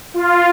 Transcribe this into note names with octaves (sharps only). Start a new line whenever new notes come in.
F4